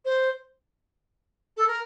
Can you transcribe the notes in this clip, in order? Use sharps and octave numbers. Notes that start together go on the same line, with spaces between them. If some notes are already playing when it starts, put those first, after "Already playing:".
C5
A4
A#4